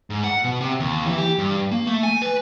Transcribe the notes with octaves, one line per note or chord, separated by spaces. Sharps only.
G#2
F#5
B2
C3
D#2
E3
G4
G2
A#3
A3
G#5
B4